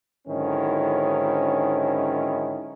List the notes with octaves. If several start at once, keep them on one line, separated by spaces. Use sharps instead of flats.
G#2 D3 D#3 F#3 C#4 E4